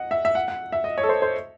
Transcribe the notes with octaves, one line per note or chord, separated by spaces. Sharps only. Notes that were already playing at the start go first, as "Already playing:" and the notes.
Already playing: D#5 F#5
E5
E5
F#5
F#5
E5
D#5
C#5
A4
C5
C5